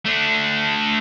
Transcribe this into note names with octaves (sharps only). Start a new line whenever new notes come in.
A3 D4